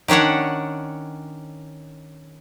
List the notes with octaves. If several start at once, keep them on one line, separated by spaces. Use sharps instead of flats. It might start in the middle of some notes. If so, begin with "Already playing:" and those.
D#3 C#4 D4 C#5 F#5